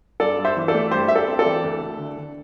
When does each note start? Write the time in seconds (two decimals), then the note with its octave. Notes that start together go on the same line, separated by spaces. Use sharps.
0.20 G2 A4 D5
0.39 G2
0.45 C5 E5
0.56 E3
0.68 A4 D5
0.74 A3
0.91 G2 G4 C5
1.08 G2 E5
1.15 A4 D5
1.28 C4
1.39 A4 D5
1.45 E3
1.64 D2
1.81 D2
1.98 D3
2.17 D3